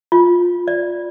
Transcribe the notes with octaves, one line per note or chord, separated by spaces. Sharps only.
F4
D5